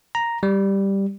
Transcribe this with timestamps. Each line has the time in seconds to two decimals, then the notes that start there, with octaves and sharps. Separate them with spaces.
0.15 A#5
0.43 G3